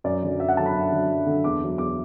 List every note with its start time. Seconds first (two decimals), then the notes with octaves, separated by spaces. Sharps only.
0.04 F#2 D5
0.23 D3 F#3
0.40 F#2 E5
0.48 F#5
0.57 D3 F#3 A5
0.66 B5
0.74 F#2
0.92 D3 F#3
1.10 F#2
1.26 D3 F#3
1.44 E2 D6
1.62 D3 F#3
1.78 E2 D6